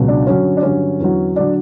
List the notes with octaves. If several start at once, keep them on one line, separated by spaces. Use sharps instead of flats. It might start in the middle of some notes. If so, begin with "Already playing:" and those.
Already playing: C#2 B2 F#3
D4
G2 D3 F#3 C#4
D4
G2 D3 F#3 C#4
E2 D3 F#3
D3 F#3 D4